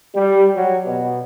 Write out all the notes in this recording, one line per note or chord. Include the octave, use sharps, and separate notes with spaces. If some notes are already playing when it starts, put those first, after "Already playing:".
G3
F#3
B2